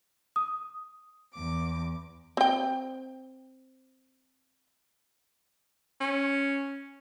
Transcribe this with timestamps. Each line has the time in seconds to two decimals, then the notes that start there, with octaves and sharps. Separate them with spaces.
0.36 D#6
1.35 E2 D6
2.37 C4 G5
6.01 C#4